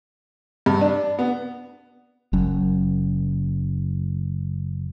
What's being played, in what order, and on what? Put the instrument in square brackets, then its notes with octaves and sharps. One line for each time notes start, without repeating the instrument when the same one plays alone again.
[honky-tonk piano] G2
D4
B3
[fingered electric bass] F#1 F#2